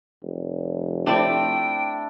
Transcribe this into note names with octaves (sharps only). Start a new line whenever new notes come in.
F1
A3 C4 D4 E4 D5 G5